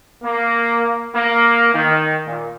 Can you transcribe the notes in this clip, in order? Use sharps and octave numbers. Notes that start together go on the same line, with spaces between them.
A#3
A#3
D#3
A#2